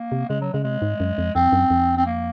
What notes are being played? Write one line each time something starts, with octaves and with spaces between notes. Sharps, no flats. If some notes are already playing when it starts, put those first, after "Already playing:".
Already playing: A#3
C3
C#3 G#3
F#3
C#3 G#3
C3 G#3
G#2
F#2
F2
F2 C4
F#2
F2
C4
A#3